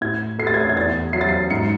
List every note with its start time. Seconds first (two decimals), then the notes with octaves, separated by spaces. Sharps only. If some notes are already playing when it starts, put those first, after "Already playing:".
0.01 A2 G#6
0.39 A3 C7
0.47 A6
0.54 G#6
0.61 A6
0.69 G#6
0.76 E2 A6
1.13 F#3 C7
1.21 A6
1.29 C7
1.50 G#2 C#7